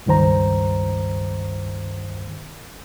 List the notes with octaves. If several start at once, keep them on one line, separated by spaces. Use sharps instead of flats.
C#2 G2 D#3 C5 A#5